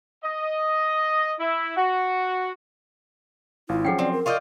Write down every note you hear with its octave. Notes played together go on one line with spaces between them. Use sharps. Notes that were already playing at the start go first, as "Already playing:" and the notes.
D#5
E4
F#4
G#1 E4 F4 F5
F3 F#3 C#4 G#4 F#5 G5
C4 D5
A#4
F4 D5 D#5 C#6 D6 G6